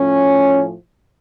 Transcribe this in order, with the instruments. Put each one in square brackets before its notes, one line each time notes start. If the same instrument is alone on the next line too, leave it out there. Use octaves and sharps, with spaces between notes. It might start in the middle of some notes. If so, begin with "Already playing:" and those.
Already playing: [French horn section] A2 F3 C#4